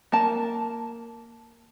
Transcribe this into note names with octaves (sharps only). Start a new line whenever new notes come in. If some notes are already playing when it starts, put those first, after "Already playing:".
A#3 A5